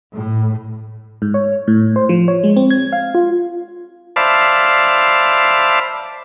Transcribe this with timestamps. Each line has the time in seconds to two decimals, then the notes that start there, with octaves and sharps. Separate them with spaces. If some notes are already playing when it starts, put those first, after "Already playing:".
0.13 A2
1.22 G#2
1.34 C#5
1.68 A2
1.96 C5
2.09 F3
2.28 C#5
2.44 G#3
2.57 C4
2.70 G#6
2.93 F5
3.15 F4
4.16 C5 D5 E5 F5 A5 B5